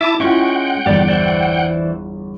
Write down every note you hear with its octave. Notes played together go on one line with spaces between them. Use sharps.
E4 E5 A5 D6
G#3 C#4 E4 F4 F#5 G5 C#6
G1 E2 G4 D5
E3 C5 D5